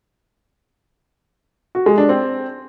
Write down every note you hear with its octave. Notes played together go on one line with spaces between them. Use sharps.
F#4
G#3
D4
C4